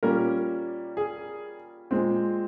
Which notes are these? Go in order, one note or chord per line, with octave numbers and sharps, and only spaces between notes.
A#2 G3 A#3 C#4 A#4
G#4
A#2 G#3 C4